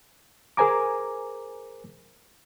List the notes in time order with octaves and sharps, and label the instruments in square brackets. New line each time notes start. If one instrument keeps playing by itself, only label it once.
[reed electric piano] G#4 A#4 C5 G#5 A#5 D6